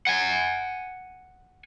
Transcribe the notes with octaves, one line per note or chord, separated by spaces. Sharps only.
F#5 G#5